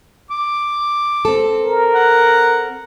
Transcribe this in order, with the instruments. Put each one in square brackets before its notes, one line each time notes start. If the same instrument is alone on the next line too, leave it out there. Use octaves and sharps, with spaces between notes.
[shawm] D6
[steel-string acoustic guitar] C4 A4
[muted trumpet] A#4
[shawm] F#5